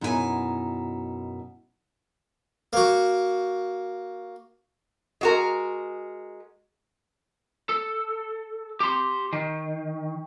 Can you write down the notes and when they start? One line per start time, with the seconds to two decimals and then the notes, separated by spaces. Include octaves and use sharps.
0.01 F#2 B2 D#4 E4 A#4 G#5
2.73 A#3 F#4
5.21 G#3 F#4 A#4
7.69 A4
8.80 G4 C6
9.33 D#3